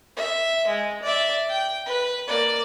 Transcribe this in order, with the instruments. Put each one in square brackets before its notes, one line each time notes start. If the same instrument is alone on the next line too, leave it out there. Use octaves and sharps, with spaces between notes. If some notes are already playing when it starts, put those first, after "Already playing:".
[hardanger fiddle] E5
G#3
D5 E5
G5
B4
A#3 D5